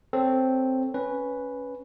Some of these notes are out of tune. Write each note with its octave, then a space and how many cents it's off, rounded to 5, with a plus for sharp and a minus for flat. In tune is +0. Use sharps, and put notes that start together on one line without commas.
C4 +0 A4 +0 C#5 +0
C#4 +0 B4 +0